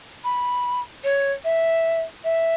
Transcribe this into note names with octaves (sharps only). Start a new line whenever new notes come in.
B5
C#5
E5
E5